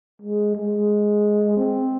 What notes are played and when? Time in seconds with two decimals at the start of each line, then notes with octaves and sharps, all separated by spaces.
0.22 G#3
0.56 G#3
1.57 C4